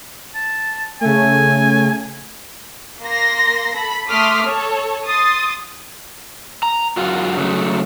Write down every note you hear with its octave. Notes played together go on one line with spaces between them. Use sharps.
A5
C#3 A3 G#5
A#3 C6 A#6
A4 B5
A3 C6 D6 D#6 F6 B6
A4 C#5
C6 D#6 A6
A#5
F#2 F4 F#4
C#3 F#3 A3